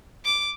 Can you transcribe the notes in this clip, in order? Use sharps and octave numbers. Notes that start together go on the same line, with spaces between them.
D6